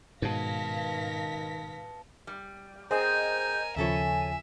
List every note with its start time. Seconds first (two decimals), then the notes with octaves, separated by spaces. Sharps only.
0.22 G#2 B2 D#3 B4 F5 A5 A#6 B6
2.27 G3
2.91 C4 G#4 A#4 C5 D#5 G#5 G6
3.76 D#2 C#3 F3 E4 A4 C#5 E5 G#5